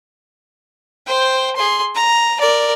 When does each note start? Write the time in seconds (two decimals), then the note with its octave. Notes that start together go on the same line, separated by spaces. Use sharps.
1.07 C5 G5
1.56 G#4 C6
1.95 A#5
2.40 A#4 D5